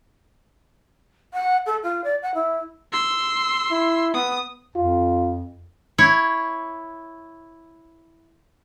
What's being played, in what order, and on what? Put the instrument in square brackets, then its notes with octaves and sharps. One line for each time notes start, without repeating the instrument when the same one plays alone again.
[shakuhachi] F#5
A4
F4
D5
F#5
E4
[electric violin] C6 E6
[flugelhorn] E4
[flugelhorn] B3 [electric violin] D#6
[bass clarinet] F2 [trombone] F4
[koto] E4 C#5